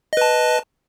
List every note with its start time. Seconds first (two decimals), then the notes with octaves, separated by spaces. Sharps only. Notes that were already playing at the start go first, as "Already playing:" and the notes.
0.13 D#5
0.17 B4
0.21 A5